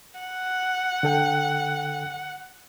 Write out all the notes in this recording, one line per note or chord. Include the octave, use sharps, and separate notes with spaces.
F#5
D3 A4 G5